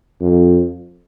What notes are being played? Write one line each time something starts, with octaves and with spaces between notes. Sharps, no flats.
F2